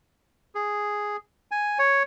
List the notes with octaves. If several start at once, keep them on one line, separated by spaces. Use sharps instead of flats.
G#4
G#5
C#5